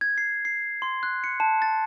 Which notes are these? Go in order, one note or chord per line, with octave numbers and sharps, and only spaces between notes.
G#6
C7
C7
C6
F#6
C#7
A5
A6